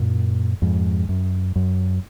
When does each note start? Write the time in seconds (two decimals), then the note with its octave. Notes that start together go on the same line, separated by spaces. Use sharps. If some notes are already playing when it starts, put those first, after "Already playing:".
Already playing: F#2 A#2
0.62 F2 G#2
1.09 F#2
1.56 F#2